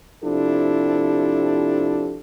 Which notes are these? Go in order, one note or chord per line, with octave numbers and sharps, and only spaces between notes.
C3 F3 D4 E4 G4 A4